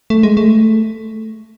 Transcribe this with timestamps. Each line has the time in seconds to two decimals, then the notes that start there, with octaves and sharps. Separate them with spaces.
0.10 A3
0.23 G#3
0.37 A3